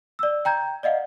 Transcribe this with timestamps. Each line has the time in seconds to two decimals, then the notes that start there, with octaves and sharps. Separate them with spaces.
0.19 D5 E6
0.45 G5 A#5 G6 G#6
0.83 D5 D#5 F5 F#5